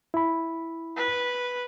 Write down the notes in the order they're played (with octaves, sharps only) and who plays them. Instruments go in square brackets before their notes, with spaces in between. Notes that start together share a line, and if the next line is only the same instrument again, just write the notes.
[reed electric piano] E4 B5
[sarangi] B4